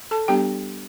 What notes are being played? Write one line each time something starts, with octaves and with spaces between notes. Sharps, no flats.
A4 A5
G3 B3 D4 G4 G5